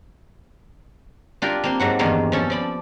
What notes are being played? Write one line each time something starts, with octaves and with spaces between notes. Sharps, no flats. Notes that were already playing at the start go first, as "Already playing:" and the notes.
D4 F4 G4 A#4
A#3 C4 C6
G#2 F#3 F#5
E2 G2 D#3 A#3 G#4
F3 C#4 A4
F3 D5 B5